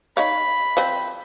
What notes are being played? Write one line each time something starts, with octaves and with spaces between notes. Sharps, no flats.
D#4 C#5 F5 B5
F3 C4 B4